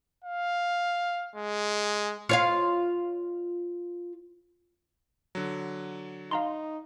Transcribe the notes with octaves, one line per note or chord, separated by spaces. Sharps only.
F5
G#3
F4 C#5 F5
D3 F#3
D#4 F5 A#5 C6